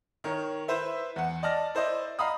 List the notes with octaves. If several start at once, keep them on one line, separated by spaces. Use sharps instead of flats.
D#3 A#4 C#5
E4 B4 C5 E5
E2 F#5
D5 D#5 A5 F6 A#6
E4 C5 D5 D#5
D#5 F5 A#5 B5 D#6